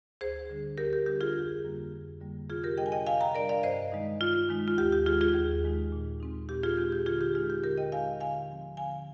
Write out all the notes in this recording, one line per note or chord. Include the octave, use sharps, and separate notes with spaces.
D2 G#4 C5
D3 G3 D4
D2 G4 A#4
G4
D3 G3 D4 G4
F4 G#4
F2
D3 G3 A#3
F2
D3 G3 A#3
C3 F4 G#4
G4 A#4
G3 D4 D#5 G5
G#5
D#5 G5
C3 F5 G#5
G5 A#5
G3 D4 A#4 D5
D5 F5
G2 C5 D#5
D#3 G#3 D#4
G2 F4
D#3 G#3 D#4
F4
D#2 G4
G4
D#3 G#3 D#4 F4 G#4
F4 G#4
D#2
D#3 G#3 D#4
A#2
G#3 C4 D#4
A#2 G4
F4 G#4
G#3 C4 D#4 G4
G4
D3 F4 G#4
G4
G#3 D#4 F4
G4
D3 G4 A#4
D#5 G5
G#3 D#4 F5 G#5
D3 F5 G#5
F3 C4
D3 F5 G#5